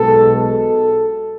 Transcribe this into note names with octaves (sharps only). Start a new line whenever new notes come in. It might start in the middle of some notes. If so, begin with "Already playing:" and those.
Already playing: B1 B2 G#3 A4
A4